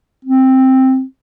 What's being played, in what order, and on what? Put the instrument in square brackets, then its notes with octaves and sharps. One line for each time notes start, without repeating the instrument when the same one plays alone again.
[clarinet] C4